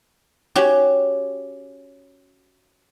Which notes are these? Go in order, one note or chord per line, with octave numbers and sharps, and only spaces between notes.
C#4 F#4 G4